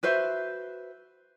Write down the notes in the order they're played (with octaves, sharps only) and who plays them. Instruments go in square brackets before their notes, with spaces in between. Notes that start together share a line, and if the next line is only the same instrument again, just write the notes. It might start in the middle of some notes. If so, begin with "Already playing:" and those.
[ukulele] F#4 B4 C5 E5